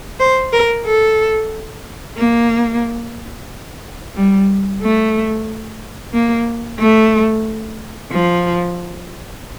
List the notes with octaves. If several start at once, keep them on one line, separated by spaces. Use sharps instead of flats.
C5
A#4
A4
A#3
G3
A3
A#3
A3
F3